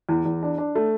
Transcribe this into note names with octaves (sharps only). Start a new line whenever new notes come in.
E2
E2
D4
D4
A3